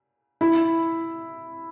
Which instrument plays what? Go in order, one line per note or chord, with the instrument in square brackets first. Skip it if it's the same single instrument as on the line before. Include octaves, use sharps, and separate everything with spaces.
[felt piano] E4